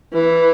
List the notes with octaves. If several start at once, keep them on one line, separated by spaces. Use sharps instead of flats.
E3